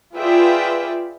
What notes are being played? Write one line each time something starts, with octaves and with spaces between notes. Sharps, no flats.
F4 G#4 B4 D5 E5 G5